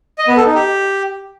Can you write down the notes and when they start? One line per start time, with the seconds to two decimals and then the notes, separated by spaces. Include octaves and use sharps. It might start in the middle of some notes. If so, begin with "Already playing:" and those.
0.18 D#5
0.27 B3
0.37 A4
0.46 D#4
0.55 G4